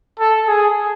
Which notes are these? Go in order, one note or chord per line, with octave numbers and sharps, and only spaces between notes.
A4
G#4